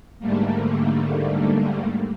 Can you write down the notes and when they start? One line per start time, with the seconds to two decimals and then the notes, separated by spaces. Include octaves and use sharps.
0.19 G#2 D3 G3 A3 A#3